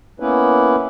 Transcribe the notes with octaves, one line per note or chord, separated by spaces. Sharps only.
A#3 B3 C#4 E4 B4